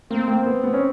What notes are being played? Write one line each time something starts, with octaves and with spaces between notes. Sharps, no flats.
A#3 C4
A#3
B3
B3
C#4